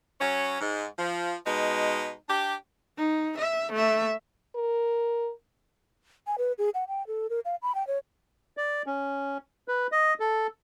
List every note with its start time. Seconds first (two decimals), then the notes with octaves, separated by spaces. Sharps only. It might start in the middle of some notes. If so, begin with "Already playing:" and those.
0.20 F#3 C#4
0.61 G#2
0.98 F3
1.46 B2 G#3 D#4
2.28 D4 G4
2.98 D#4
3.38 E5
3.72 A3 E5
4.55 A#4
6.27 G#5
6.38 B4
6.58 G#4
6.74 F#5
6.88 G5
7.07 A4
7.30 A#4
7.45 F5
7.62 B5
7.75 G5
7.87 C#5
8.57 D5
8.86 C#4
9.68 B4
9.92 D#5
10.20 A4